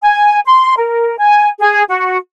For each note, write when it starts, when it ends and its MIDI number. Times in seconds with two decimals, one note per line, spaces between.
0.03 0.39 80
0.45 0.74 84
0.77 1.17 70
1.18 1.48 80
1.60 1.82 68
1.88 2.18 66